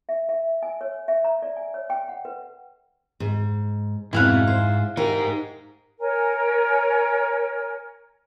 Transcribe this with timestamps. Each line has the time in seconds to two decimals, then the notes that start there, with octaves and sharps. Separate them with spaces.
0.09 E5
0.29 E5
0.63 G#5
0.81 C#5
1.08 E5
1.24 A#5
1.42 D5
1.56 G#5
1.74 C#5
1.90 G5
2.09 F#5
2.25 B4
3.20 G#2
4.13 F2 G#2 B2 G#3 E4 F5 F#5
4.47 C5
4.97 D#4 G4 A#4 C5
5.99 A#4 C#5 G#5